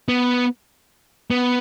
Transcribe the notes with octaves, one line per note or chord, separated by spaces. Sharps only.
B3
B3